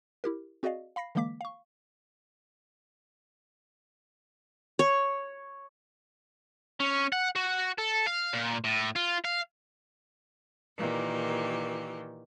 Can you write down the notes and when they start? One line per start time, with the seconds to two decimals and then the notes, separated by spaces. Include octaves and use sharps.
0.24 E4 G4 A#4
0.63 C4 F#4 G#4 D5 D#5 F5
0.96 F5 B5 A#6 C7
1.15 D3 E3 G#3 A#3 D6 B6
1.41 F5 C#6
4.79 C#5
6.80 C#4
7.12 F#5
7.36 F#4
7.78 A4
8.06 F5
8.33 A#2
8.64 A2
8.96 F4
9.25 F5
10.77 A#2 D#3 E3 G4